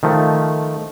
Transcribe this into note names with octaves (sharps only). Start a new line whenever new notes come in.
D#3 F3 A3